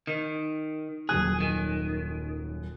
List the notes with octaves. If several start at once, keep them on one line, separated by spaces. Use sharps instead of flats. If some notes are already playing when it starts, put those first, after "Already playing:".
D#3
D#1 F#2 G#4 F#6
D#3